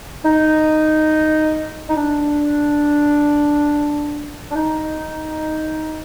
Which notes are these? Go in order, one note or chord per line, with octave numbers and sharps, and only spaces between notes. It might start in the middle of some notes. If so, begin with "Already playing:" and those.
D#4
D#4
D4
D4
D#4